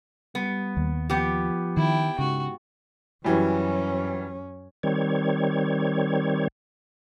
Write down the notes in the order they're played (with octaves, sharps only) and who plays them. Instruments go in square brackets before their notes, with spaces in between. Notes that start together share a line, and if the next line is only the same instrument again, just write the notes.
[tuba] G3 [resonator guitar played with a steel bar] B3
[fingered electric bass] D#2
[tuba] F3 [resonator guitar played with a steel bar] B3 G4
[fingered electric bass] D#3 [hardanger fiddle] E4 G5
[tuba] G#2 [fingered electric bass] C#3 [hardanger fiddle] F#4
[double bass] F#2 C#4 [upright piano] E3 F#3 G3
[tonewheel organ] D#3 G3 C4 C#5